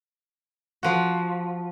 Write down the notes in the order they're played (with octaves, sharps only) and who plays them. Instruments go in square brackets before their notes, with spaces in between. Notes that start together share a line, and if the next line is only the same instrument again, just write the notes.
[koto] F3 F#4